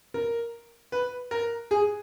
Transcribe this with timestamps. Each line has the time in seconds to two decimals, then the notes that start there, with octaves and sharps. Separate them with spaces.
0.14 A#4
0.92 B4
1.31 A#4
1.71 G#4